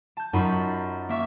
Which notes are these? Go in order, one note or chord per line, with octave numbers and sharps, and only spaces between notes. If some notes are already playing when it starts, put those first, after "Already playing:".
A5 G6
F#2 D#4 F4 B5 C#6
A#3 E5 C#6